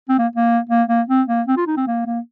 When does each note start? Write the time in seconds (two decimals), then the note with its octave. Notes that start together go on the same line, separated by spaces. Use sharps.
0.09 C4
0.18 A#3
0.35 A#3
0.69 A#3
0.88 A#3
1.09 C4
1.28 A#3
1.47 C4
1.57 F4
1.67 D#4
1.77 C4
1.87 A#3
2.06 A#3